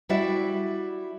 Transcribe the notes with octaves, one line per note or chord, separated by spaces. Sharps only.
G3 E4 F#4 D5 E5